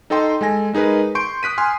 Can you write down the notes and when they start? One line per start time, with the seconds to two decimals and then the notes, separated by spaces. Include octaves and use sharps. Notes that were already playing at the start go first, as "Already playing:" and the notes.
0.10 D#4 A4 D#5 G5 C6
0.41 G#3 A4 G#5 A#6
0.73 G#3 D#4 G#4 A#4 B4
1.15 C6 C#6 G6 D7
1.43 D#6 F#6 B6 D#7
1.58 G#5 C6 F6